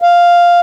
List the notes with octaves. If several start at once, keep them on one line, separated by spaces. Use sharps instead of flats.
F5